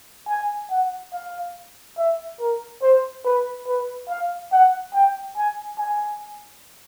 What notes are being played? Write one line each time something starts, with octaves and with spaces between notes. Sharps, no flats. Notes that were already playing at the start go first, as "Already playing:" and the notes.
G#5
F#5
F5
E5
A#4
C5
B4
B4
F5
F#5
G5
G#5
G#5